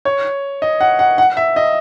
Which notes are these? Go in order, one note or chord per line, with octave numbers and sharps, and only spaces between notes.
C#5
D#5
F#5
F#5
F#5
E5
D#5